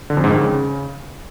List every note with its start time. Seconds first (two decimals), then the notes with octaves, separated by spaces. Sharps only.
0.10 D3
0.17 F2
0.24 G#2
0.31 D#3
0.38 C#3